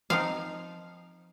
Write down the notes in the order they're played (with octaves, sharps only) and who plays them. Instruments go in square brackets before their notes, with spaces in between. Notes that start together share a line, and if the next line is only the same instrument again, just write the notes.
[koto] F3 C4 D#4 F5